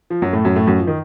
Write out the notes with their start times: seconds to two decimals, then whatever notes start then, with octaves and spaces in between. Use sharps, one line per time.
0.10 F3
0.22 F#2 F#3
0.33 A2 A3
0.45 F#2 F#3
0.56 A2 A3
0.67 F#2 F#3
0.79 F3
0.87 D#3